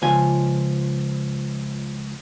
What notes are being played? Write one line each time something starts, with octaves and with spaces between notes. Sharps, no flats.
C#2 F3 G#5